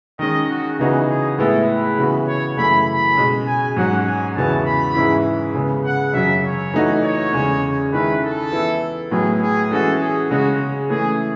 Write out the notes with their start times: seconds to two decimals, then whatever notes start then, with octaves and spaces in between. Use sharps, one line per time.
0.19 D#3 G#3 C#4 D#5
0.49 F#4
0.79 C#3 E3 B3 D#4 F#4 G#4
1.08 G#4
1.38 A2 G#3 B3 E4 A4
1.69 B4
1.98 C#3 E3 B3 F#4
2.27 C#5
2.57 F#2 C#3 E3 A3 E4 B5
2.87 B5
3.17 B2 G#3 C#4
3.46 G#5
3.76 G#2 F#3 C#4 F#4 F#5
4.06 G#5
4.36 E2 C#3 E3 B3 F#4 A5
4.65 B5
4.95 G#2 E3 G#3 C#4 E4
5.55 C#3 G#3 B3
5.85 F#5
6.14 F#2 C#3 F#3 E5
6.44 C#5
6.74 E3 A3 D#4 F#4
7.03 C#5
7.33 E2 C#3 G#3 C#4
7.93 D#3 G#3 C#4 E4 B4
8.22 A4
8.52 E3 B3 E4
9.11 A2 F#3 B3 G#4
9.41 G#4
9.71 E3 G#3 C#4 F#4 A4
10.01 G#4
10.30 C#3 G#3 C#4 F#4
10.90 E3 A3 C#4 G#4